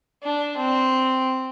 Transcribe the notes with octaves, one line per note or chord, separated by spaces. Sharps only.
D4
C4